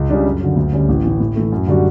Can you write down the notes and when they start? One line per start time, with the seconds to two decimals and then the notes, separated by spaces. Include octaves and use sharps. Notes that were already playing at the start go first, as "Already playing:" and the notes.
Already playing: C#2
0.10 C#3 G3 D4
0.25 F#2
0.40 D3 F#3
0.56 D2
0.72 D3 G3 C#4
0.89 A1
1.03 A2 E3
1.20 A2
1.36 E3 A3
1.52 F#2
1.67 D3 G3 D4 F#4